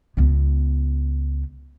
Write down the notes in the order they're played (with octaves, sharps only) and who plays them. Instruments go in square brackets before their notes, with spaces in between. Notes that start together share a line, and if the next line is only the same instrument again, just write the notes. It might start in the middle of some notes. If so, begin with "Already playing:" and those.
[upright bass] C#2 B3